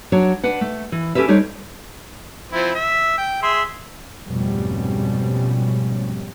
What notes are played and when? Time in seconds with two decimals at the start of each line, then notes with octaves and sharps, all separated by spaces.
0.12 F#3 D4 C#5
0.44 D4 B4 F#5
0.61 A3
0.92 E3
1.15 C#4 G4 A4 B4 E5
1.28 G3 A3 D4 D#4 C5 C#5
2.52 F3 C4 E4
2.75 E5
3.18 G5
3.42 G#4 E5 C6
4.26 F2 G#2 B2 G3 A3 C#4